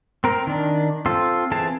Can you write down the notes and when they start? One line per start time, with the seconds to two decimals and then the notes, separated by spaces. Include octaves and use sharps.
0.24 C4 A#4
0.47 D#3 D4
1.06 C4 F4 A4
1.51 E3 C4 G#4 A5